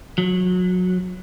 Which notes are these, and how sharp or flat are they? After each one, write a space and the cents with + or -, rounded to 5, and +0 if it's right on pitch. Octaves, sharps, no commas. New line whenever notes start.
F#3 -25